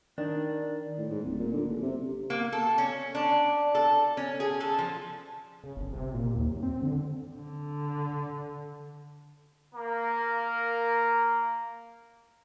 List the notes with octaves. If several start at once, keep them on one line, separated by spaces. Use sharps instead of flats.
D#3 D4
A2
G#2
D1
A#2
D3
F#1
C3
A#3
A4
C#4
D4
A4
C#4
G#4
A4
F3
C#3
G1
C3
A#2
D#2
F#2
C4
D3
D3
A#3 A#4 A#5